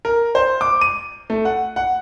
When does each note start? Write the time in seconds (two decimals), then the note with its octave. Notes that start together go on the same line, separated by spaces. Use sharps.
0.05 A#4
0.35 C5
0.61 D6
0.81 D#7
1.30 A3
1.45 F#5
1.76 F#5